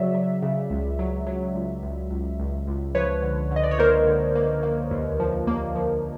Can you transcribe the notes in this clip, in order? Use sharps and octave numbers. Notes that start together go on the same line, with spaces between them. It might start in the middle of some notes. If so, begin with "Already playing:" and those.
Already playing: C#3 F#3 D5 E5
F#3
C#3
C#2
F#3
F#3
C#2
C#2
C#2
C#2
C#2
F3 B4 C#5
D3
D3
D#5
D5
C#5
A#3 A#4 C5
D3
A#3
A#3
D#2
F3
A#3
F3